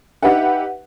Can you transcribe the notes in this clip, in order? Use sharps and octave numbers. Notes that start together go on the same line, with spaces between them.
D#4 G4 B4 E5 F#5